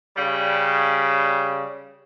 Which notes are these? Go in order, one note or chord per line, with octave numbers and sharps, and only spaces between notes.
C#3 G3